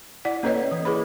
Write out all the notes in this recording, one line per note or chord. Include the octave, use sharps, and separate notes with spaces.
E4 D5 F#5
A#3 C#4 A4 B4 C#5 D#5
E3
E4 G#4 B4 B5